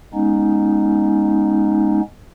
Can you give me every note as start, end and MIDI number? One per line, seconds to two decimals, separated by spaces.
0.14 2.00 56
0.14 2.00 59
0.14 2.00 61
0.14 2.00 63